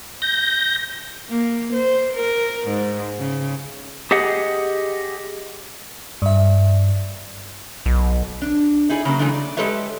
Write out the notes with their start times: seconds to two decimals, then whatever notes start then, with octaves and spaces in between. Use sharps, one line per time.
0.22 G6 A#6
1.29 A#3
1.74 C5
2.14 A#4
2.68 G#2
3.19 C#3
4.11 G4 G#4 D#5 F#5
6.22 G2 E5
7.86 B1
8.42 D4
8.89 D#4 E4 G#4 B4 D5
9.05 C#3 F#3 A#3
9.19 C#3 E3 G#3 A3 D4
9.34 D5
9.57 G#3 G4 A4 B4 C#5 E5